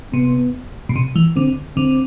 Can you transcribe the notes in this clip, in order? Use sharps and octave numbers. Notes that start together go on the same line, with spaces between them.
C3 B3
B2
C3
E3
D3 C4
D3 C4